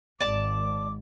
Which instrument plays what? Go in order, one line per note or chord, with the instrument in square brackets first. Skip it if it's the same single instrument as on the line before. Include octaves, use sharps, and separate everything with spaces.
[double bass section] G#1 [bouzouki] D5 A5 [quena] D6